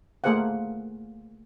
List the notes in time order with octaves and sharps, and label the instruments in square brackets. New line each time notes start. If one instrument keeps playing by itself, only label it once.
[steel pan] A3 A#3 G#4 C5 F5 F#5